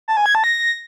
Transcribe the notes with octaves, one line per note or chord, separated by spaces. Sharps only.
A5
G#5
G#6
A5
A#6